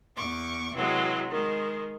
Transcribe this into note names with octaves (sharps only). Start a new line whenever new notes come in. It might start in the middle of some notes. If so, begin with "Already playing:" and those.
E2 C#6 D6
C3 E3 F#3 G#3
D#3 G#3